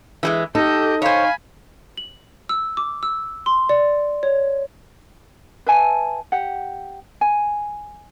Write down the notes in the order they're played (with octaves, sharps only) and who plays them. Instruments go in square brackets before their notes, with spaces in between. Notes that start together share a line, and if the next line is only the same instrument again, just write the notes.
[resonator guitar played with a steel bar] E3 G3 G#3
[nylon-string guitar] D#4 [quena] G4 [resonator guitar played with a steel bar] A4 [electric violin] D#5 G6
[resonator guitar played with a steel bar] C5 C#5 [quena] F5 [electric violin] G#5 B5
[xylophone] F#7
E6
D6
E6
C6
D5
C#5
[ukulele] B4 E5 G#5 A5
G4 F#5
G#5